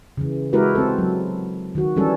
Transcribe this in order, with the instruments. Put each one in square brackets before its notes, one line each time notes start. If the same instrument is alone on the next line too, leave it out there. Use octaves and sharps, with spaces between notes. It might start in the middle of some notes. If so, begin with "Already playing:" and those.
[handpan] C#3 E3
G#3 E4 F#4 G4 A#4 B4
C4 A4
F#3
D#3 F#4
E3 G3 C#4 A4